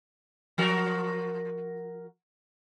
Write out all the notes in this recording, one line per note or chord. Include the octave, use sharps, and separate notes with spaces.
F3 F#4 A#4